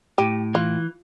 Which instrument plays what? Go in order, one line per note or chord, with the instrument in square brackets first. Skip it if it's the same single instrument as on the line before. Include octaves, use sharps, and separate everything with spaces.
[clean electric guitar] A2 [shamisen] G4
[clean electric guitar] E3 [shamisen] F4